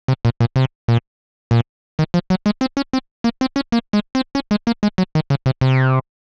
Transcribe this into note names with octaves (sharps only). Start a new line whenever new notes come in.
C3
A#2
A#2
C3
A#2
A#2
D#3
F3
F#3
G#3
C4
C#4
C4
A#3
C4
C#4
A#3
G#3
C4
C#4
G#3
A#3
G#3
F#3
D#3
C#3
C3
C3